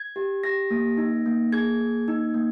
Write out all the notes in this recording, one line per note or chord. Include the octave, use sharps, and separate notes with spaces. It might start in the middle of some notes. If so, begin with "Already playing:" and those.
Already playing: G#6
G4
G4 A#6
A#3
D#4
A#3
G#4 G#6
A#3
D#4
A#3